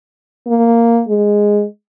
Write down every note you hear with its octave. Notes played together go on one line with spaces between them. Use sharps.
A#3
G#3